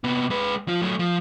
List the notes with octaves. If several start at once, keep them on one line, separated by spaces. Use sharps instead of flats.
C3 B3
G#3 B4
F3 F4
F#3 A3
F3